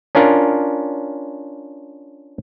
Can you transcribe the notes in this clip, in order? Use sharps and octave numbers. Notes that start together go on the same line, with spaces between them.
C#4 D4 F4 A#4